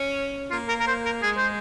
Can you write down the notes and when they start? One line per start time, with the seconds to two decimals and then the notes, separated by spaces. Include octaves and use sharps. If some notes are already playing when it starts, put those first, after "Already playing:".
Already playing: C#4
0.51 A#3 F4
0.69 A#4
0.80 A#4
0.88 C5
1.05 A#4
1.23 G#3 G#4
1.38 C5